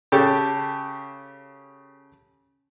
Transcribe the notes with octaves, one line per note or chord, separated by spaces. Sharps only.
C#3 G4 A4 A5